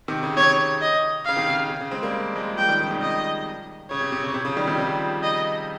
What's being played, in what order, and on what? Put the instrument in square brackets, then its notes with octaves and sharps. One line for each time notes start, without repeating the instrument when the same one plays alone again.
[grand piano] C3 D#3
C#3
[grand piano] C3 [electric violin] C#5
[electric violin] D#5
[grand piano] C#3 [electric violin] F5
[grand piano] C3 D#3
C#3
C#3
C3
C#3
G#3 C4
G3 A#3
F3 G#3
[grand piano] F3 G#3 [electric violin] G5
[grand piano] D#3 G3
C#3 F3
C3 D#3
[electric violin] D#5
[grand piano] C#3 [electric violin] C#5
[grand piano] C3
C3
C#3
C3
C#3 F3
D#3 G3
C3 D#3
G3
C#3 F3
[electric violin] D#5